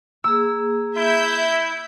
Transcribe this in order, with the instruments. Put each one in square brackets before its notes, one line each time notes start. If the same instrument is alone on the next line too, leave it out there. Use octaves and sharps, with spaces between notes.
[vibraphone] A#3 G#4 [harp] E6
[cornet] E4 [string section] E5 G6